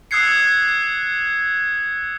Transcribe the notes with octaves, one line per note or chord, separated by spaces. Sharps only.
D#6 E6 F#6 G#6 C7 C#7